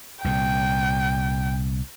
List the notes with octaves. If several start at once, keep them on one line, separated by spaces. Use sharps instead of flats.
C2 A#2 G5